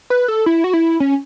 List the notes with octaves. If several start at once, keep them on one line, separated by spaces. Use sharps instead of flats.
B4
A4
E4
F#4
E4
C#4